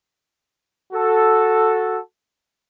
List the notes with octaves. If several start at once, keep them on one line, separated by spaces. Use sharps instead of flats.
F#4 A4